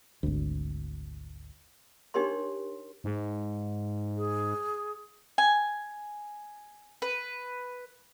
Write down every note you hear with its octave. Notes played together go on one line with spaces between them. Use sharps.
G#1 D2
D4 D#4 G4 A#4 C#5 C6
G#2
G#4
G#5
B4